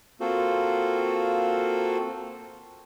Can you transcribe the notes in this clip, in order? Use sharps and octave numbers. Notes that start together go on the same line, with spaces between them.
A#3 C4 F4 F#4 A4 C5